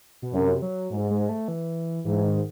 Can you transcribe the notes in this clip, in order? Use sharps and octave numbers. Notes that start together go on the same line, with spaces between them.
B2
F#2 C3
F#3
G#2
G#3
A3
E3
G#2 E3
D#3